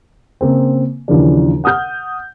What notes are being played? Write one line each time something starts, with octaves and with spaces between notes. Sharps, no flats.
C#3 A#3 C4
D#2 C#3 E3 F3 D4
F#5 D#6 F6 G6